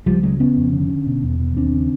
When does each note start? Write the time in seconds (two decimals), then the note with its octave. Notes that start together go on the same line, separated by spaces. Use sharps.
0.06 C#2 F3 G3
0.23 C#3 F#3 G#3
0.40 C#3 B3 C#4
0.56 F2
0.73 D3
0.89 D3
1.06 B2
1.23 E2
1.39 B2
1.56 D#2 C4 D4
1.73 C#3